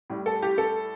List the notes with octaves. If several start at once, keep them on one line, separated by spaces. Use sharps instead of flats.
A2 G3
A4
G4
A4